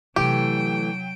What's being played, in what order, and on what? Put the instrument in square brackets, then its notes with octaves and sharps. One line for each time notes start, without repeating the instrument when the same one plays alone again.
[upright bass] C3 D4 [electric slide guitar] E3 A3 [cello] F#3 G5 [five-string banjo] G4